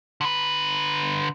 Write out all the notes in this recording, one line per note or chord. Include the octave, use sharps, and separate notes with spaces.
D3 B4